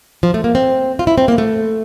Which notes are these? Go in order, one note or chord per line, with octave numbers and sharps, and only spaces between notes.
F3
A3
A#3
C4
F4
E4
C4
A#3
A3